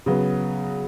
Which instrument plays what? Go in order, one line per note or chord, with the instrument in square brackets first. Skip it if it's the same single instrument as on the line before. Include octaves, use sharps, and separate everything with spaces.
[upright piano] C#3 F#3 B3